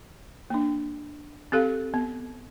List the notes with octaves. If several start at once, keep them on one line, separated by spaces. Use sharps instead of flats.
A#3 D4
C4 G4 A4 F5
B3